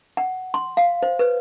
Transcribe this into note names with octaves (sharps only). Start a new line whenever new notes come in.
F#5
C6
F5
C5
B4